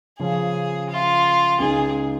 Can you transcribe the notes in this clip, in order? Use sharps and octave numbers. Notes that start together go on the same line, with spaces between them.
C#3 F3 C#4 G#4
F4
C#2 C#3 G#3 D#4 G#4